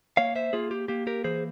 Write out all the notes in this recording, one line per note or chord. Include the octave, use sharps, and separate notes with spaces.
A#3 C#5 F5
C5 E5
A#3 F4 G#4
G4
A#3 G4
G4 A#4
E3 G#4 C5